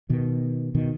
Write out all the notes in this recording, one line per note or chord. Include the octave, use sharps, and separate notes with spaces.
B2 D#3
B2 D#3